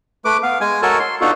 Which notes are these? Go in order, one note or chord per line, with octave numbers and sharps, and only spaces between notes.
A3 B4 D6
B3 F5
G#3 G#5
F#4 A4 A#4 C#5 G#5 A5
C6
B3 D4 D#4 F4 F#4 A4